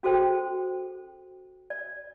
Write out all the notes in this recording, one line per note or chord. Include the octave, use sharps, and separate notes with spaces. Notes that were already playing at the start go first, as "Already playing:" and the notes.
C#4 F#4 G#4 A4 C5 G5
D5